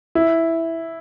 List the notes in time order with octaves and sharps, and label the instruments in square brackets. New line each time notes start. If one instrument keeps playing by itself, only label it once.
[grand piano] E4